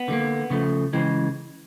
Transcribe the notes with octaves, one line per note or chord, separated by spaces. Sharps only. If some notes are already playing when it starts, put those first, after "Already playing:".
Already playing: B3
D3 G3 A#3
C#3 F3 A3
C#3 E3 G#3 C4